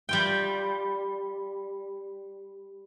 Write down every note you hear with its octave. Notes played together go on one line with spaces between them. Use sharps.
G3 F4 G5